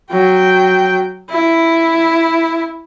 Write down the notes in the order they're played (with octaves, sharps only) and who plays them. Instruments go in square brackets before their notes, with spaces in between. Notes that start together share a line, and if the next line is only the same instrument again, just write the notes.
[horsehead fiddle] F#3 G5
E4